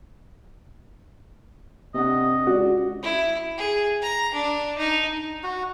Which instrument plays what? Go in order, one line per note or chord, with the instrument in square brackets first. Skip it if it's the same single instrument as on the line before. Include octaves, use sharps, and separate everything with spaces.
[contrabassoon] C3 [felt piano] C4 D4 F#5 [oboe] D#5
[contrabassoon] C#2 [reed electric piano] F#4 [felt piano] D5
[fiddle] E4
G#4
A#5
D4
D#4
[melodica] F#4